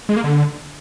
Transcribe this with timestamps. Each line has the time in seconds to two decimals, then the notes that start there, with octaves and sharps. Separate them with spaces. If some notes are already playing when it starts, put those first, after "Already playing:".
0.09 G#3
0.16 A#3
0.24 D3